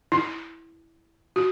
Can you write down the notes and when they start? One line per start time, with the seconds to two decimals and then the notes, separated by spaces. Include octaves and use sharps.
0.12 E4
1.36 F#4